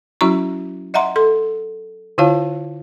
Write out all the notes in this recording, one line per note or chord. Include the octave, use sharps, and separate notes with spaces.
F#3 C#4 E4 F#4 A#5 C#6
D#5 E5 F#5 A#5 C6
A4 C6
D3 E4 F4 C#5 F5 A5